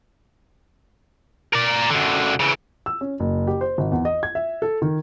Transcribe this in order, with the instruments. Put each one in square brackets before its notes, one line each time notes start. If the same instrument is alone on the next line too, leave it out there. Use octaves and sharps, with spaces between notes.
[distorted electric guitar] A#4 D5
F#2 D3
C#3 E3
[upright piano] E6
C#4
F#1
G4
C5
G#1
E2
D#5
G#6
E5
A4
D#3